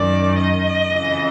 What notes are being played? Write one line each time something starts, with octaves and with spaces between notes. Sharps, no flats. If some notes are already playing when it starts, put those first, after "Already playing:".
Already playing: F#2 D#3 D5
D#5
F2 C#3 E3